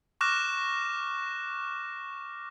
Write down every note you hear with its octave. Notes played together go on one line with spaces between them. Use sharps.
C#6 D6 F6 F#6 A#6 E7